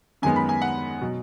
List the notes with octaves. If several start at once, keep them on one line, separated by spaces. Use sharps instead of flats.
F#2 D#3 G#3 B3 G#5
B5
G#5
F#5
B2 F#3